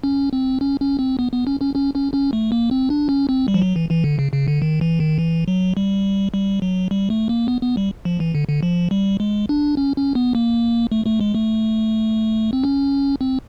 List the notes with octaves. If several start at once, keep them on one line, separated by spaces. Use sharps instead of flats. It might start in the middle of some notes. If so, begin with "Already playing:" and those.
C#4
C4
C#4
C#4
C4
B3
B3
C#4
C#4
C#4
C#4
C#4
A3
A#3
C4
D4
C#4
C4
G3
F3
F#3
E3
E3
D3
C#3
C#3
D3
D#3
E3
D#3
E3
F#3
G3
G3
F#3
G3
A3
A#3
B3
B3
G3
F3
E3
D3
D3
F3
G3
G#3
D4
C#4
C#4
B3
A#3
A3
A3
G#3
A3
C4
C#4
C4